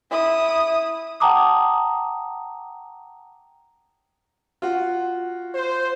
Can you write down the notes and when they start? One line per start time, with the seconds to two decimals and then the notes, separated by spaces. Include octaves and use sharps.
0.11 E4 D#6
1.20 F#5 G5 A5 A#5 D6 D#6
4.62 F4 F#4
5.54 C5